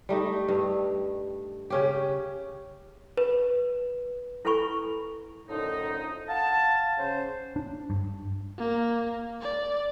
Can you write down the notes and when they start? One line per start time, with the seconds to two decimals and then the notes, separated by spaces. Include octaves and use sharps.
0.09 G3 A3 D#4
0.48 G2
1.70 C#3 C#4 G4
3.17 B4
4.45 E4 A4 B4 G#5 B5 C#6
5.49 F#2 A2 D3 F3 D#4
6.29 F5 F#5 A5
6.98 C#3 C5
7.56 D4
7.90 G2
8.58 A#3
9.41 D5